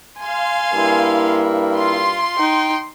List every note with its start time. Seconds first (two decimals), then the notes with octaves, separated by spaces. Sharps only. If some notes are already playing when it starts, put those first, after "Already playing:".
0.20 F5 G#5 C6
0.74 G2 A#3 E4
1.77 F4 C6
2.39 D#4 G5